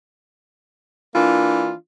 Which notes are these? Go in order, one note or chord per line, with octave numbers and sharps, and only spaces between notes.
E3 A#3 D4 F4